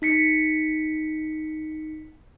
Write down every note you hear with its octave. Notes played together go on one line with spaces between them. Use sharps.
D#4 B6 C#7